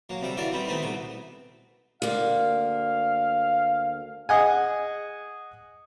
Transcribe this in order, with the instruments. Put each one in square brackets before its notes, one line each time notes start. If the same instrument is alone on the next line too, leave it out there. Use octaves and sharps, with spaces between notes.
[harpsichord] F#3 A#3
C3 G3 A4
E3 F#3 F4 A4 A#4 D5
G3 B3 C4
D#3 A3 B3 C4 D#4
C2 B2 A4
[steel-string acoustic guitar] D2 A#3 [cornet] F5
[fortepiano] G#4 D#5 F#5 G#5